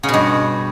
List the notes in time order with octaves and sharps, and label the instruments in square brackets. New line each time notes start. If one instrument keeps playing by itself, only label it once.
[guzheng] C#3
B2
G2